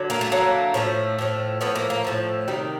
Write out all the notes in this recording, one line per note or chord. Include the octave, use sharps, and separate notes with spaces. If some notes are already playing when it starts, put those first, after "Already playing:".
Already playing: D3 F#3
A#3
A3
D3 F#3 A3 A#3
A2 F3 A3
A2 F3 A3
A2 F3 A3 B3
A#3
A#3
A2 F3 A3
C3 D#3 G3